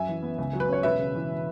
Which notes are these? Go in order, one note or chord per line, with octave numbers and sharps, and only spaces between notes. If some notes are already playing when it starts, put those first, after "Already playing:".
Already playing: F#2 E5 G#5
E3
B3
C#2
F#3
B4
C#4 C#5
E1 B4 E5
C#3
E3